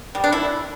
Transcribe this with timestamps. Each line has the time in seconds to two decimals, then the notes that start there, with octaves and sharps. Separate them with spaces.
0.15 G3
0.24 D4
0.32 E4